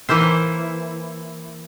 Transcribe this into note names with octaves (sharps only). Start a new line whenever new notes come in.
E3 A#3 E4 C5